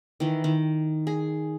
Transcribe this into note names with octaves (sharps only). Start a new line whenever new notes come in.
D#3 E3
D#3
G#4